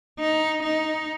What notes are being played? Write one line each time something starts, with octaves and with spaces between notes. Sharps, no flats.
D#4
D#4